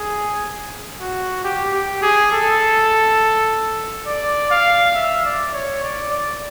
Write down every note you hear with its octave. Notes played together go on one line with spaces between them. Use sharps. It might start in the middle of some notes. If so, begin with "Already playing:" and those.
Already playing: G#4
F#4
G4
G4
G#4
A4
D5
F5
E5
D5
C#5
D5
D5